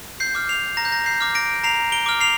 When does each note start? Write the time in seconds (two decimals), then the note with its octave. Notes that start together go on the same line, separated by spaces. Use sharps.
0.20 G6 C7
0.35 D6 F6
0.49 C7 F7
0.77 A#5 A#6
0.85 G6
0.92 A#6
1.06 G6 C7
1.21 D6 F6
1.35 A#6 D7
1.64 A#5 C7 F7
1.92 D7 G7
2.06 D6 F6
2.21 C7 F7